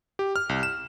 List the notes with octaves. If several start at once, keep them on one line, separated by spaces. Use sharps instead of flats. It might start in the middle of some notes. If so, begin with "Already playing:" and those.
G4
F6
C2
E7